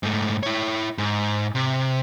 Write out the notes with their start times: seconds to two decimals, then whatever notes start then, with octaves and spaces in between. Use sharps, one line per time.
0.03 G#2 A3
0.43 E4 C#5
0.98 G#2
1.55 C3